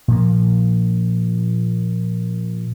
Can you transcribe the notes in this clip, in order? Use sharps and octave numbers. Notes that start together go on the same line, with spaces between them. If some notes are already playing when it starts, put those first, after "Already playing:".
A#2 F3 A#3